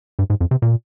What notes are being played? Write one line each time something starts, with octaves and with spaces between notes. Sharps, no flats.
G2
G#2
F2
C3
A#2